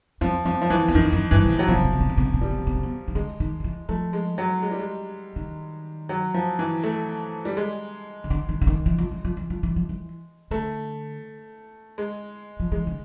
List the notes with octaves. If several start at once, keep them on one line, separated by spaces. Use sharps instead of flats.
F2 F3
F2 F3
F3
F2 E3
E2
F2 D#3
F#2
G2 E3
B2
A#2
F#3
B2 F3
C3
B2
C3
B2
C3
B2
C3
B2
C3 G3
B2
C3
B2
C3
B2
D#3
D3 G#3
D#3
F3
E3
F3 A3
G#3
F#3
G#3
G3
G#3
D#3
F#3
F3
E3
A3
G3
G#3
D#3
D3
D#3
D3
D#3
E3
F3
E3
F3
E3
F3
E3
F3
E3
D3 A3
G#3
F3
E3 G#3
D3